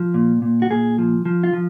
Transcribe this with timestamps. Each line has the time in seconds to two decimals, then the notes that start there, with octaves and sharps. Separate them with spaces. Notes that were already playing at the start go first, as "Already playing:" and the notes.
Already playing: F3
0.14 A#2
0.42 A#2
0.62 F#4
0.70 A#2 G#4
0.98 F3
1.25 F3
1.43 F4
1.53 F3